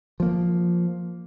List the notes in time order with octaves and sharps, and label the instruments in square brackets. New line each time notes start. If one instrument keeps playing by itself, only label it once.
[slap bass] F3 A#3